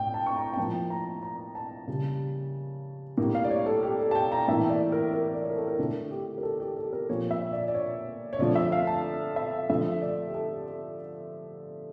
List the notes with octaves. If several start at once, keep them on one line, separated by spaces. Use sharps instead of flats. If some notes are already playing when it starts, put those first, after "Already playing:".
Already playing: A2 G5
A5
C#6
A#5
G5
A2 F3 A#3 A5
A#5
A#5
A5
C#3 G3 A#3
A2 G3 A#3
F5
D5
C#5
A4
G4
A4
A5
G5
A#5
A2 E3 A#3 E5
D5
A#4
A#4
D5
C#5
A#4
A4
A#4
D3 A3 A4
G4
A#4
A4
G4
A4
A#4
A#2 F3 A#3 C#5
E5
D5
D5
C#5
C#5
D3 F3 A3 D5
E5
F5
A5
E5
D3 F3 A3 E5
D5
G4
A4
A4